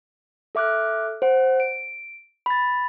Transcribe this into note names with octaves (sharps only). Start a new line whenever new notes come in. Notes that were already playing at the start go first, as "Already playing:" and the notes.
A4 E5 D6 F6 F#6
C5 F#5
D7
B5 A6